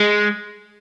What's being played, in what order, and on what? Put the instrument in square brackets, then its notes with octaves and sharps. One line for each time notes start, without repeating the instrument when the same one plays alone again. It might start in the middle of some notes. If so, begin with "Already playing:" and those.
Already playing: [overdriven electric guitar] G#3